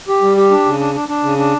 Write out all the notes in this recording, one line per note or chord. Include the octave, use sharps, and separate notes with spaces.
G4
G3
G4
D4
C#3
D4
D4
D4
C#3
D4